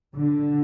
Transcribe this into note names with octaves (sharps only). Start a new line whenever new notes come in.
D3